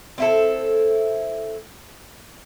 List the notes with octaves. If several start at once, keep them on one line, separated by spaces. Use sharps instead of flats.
C4 E4 A4